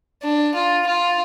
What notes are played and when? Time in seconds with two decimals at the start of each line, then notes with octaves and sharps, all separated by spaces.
0.22 D4
0.54 F4
0.86 F4